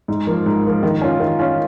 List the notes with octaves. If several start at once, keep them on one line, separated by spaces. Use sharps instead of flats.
G#2
F3 A#3
G#2
F3 A#3
D#3
C#4 F4
D#3
C#4 F4